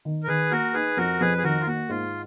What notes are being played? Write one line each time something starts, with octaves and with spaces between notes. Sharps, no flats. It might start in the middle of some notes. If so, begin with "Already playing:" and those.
D#3
A#4
D#3 G#4 B4
A#3 F#4 A#4
D#4 G#4 B4
F2 F#4 A#4
F2 G#4 B4
G#4
D#3 F#4 A#4
F4
A#3 F#4
G#2 F4